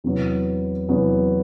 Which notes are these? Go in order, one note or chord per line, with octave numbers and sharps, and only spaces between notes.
E2 C3 F#3 B3
E2 C3 F#3 B3